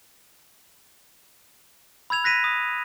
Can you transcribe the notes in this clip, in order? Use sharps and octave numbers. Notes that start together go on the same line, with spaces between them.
B5 E6 G#6 F7
F#6 A#6 B6 D#7
D#6